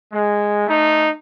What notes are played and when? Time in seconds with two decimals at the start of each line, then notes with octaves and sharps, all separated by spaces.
0.13 G#3
0.67 A3 D#4